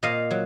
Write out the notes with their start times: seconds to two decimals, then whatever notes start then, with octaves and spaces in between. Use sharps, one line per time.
0.03 A#2 D#5 F5
0.31 F#3